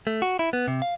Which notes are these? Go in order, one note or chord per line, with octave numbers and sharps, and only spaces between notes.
A3
F#4
E4
B3
C3
F5